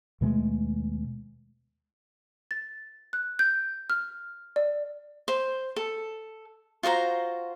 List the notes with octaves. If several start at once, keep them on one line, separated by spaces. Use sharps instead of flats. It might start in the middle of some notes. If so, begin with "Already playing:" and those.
D#2 B2 G#3 A3
A6
F#6
G6
F6
D5
C5
A4
F4 F#4 C5 A#5